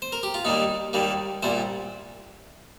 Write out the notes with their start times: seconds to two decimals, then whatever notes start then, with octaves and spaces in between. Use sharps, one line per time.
0.02 C5
0.12 A#4
0.23 G4
0.34 F4
0.45 D#2 D#3 G3 A#3 D#4
0.93 D#2 D#3 G3 A#3
1.43 C2 A#2 G3 C5